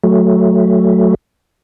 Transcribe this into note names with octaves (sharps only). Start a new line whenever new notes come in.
F#3 A3